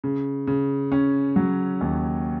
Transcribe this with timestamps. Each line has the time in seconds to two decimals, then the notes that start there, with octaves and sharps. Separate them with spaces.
0.04 C#3
0.47 C#3
0.92 C#4
1.36 F#3
1.81 D#2